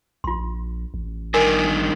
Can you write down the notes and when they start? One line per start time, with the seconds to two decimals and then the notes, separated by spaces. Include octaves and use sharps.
0.24 A#1 F4 C6
0.94 A1
1.34 G2 D#3 A#4 D#5 G#5
1.66 D#6